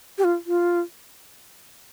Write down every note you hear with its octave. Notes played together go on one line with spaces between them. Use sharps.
G4
F4
F4